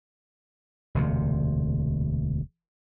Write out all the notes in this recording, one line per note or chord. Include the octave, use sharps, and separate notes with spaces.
E1 D2 C3